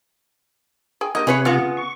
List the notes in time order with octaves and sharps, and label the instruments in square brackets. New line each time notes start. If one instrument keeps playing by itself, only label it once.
[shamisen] G#4 G5 G#5
[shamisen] A#3 D#4 G4 [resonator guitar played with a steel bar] D#5
[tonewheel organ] C3 [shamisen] C#4 E5 G#5 [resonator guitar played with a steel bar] G#4 B4 C#5
[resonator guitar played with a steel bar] C#3 B3 [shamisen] F4 F5
[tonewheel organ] C#6